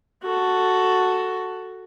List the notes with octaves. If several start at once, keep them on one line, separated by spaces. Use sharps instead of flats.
F#4 A4